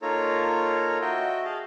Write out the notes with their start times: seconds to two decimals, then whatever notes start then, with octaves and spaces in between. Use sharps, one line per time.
0.02 A#3 D#4 F4 A4 C#5 A#5
1.01 F#4 D#5 E5 G5
1.45 G#4 D#5 F5 A5